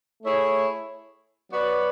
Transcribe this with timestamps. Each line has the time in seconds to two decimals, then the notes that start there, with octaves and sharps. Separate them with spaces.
0.22 A3 E4 G#4 C#5 E5
1.50 F#3 B3 F#4 B4 D5